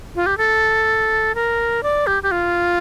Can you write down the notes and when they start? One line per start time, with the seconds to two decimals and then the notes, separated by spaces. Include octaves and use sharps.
0.16 F4
0.26 G4
0.38 A4
1.35 A#4
1.83 D5
2.07 G4
2.23 G4
2.31 F4